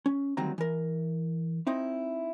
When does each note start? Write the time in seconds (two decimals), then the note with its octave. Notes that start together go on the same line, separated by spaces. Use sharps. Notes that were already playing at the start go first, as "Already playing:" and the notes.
0.06 C#4
0.37 D2 D#3 F#3 G3 C4 A#5
0.58 E3 A#4
1.67 C4 D#4 E4